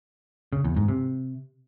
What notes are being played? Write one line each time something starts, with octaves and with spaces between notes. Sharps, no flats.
C#3
E2
G#2
C3